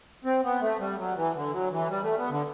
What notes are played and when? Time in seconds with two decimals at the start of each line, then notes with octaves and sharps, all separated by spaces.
0.25 C4
0.44 B3
0.61 A3
0.79 G3
0.98 F#3
1.16 E3
1.35 D3
1.52 F#3
1.72 E3
1.89 G3
2.03 A3
2.17 B3
2.30 D3